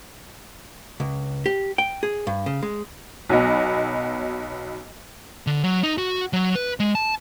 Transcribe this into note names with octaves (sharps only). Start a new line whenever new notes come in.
C#2
G4
G5
G#4
G2
C#3
G#3
B1 F#3 B3 D#5
D3
F#3
D#4
F#4
F#3
B4
G#3
A5